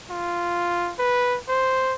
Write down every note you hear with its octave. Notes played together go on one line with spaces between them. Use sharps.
F4
B4
C5